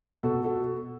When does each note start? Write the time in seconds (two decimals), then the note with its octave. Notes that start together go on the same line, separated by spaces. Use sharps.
0.23 B2 F#4 A4
0.44 F#4 A4